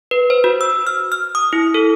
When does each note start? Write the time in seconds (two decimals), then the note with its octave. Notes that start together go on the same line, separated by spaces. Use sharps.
0.11 B4
0.30 C5
0.44 F#4
0.61 E6
0.87 F6
1.12 F6
1.35 D#6
1.53 E4
1.74 A4